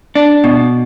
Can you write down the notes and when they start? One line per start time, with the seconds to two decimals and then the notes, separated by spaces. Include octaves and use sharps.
0.15 D4
0.44 B2